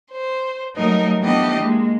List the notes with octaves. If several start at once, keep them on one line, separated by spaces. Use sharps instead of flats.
C5
F#3 G3 A3 D#4 A#4 D#5
E3 A3 B3 D4 G4 D#5
G#3 A#3